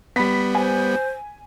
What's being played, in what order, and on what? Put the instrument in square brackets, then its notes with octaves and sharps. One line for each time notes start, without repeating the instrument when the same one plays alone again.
[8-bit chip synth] G3 B3 [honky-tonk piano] B5 B6
[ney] C5 [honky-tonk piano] G#5